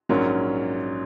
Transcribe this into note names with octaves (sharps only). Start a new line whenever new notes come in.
A#1 G#2 F#3 C#4 A#4